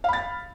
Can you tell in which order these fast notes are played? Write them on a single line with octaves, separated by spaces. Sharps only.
F5 B5 A6